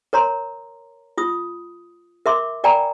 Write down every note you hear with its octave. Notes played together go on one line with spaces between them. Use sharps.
A#4 C#5 A#5 C6
F4 D#6
A#4 E5 C6 D6
A#4 D5 G5 G#5 A#5 B5